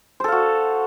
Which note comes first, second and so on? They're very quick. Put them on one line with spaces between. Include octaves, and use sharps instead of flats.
C5 A4 F5 F#4